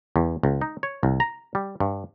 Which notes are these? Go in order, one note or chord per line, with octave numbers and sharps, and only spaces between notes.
E2
C#2
D#4
C#5
C2
A#5
G3
G2